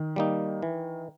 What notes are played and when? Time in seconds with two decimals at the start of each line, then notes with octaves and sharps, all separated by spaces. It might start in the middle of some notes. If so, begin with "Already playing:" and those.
Already playing: D#3
0.16 G3 A#3 D#4
0.62 E3